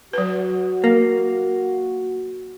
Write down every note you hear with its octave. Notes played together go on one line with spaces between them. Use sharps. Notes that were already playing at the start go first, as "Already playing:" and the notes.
F#3 F#4 B4
A#3